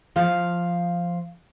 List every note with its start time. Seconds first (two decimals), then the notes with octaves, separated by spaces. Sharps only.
0.16 F3 F5